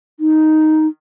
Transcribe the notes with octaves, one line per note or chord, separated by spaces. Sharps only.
D#4